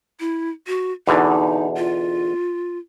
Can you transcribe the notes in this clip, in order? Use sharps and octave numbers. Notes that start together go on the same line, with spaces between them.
E4
F#4
E2 B2 D3 D#4
F4